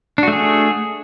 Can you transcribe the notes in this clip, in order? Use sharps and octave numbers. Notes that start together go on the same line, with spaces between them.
A3 D4 F#4 G#4